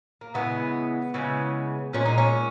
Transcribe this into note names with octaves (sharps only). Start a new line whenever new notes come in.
A#3
C#3 E3 G#3 B3
C#3 E3 G#3
A#2 G#3 C#4
D#4
C#4